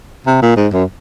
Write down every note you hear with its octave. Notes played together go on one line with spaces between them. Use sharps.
C3
A#2
G#2
F#2